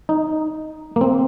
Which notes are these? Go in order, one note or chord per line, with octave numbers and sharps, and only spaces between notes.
D#4
A#3
C4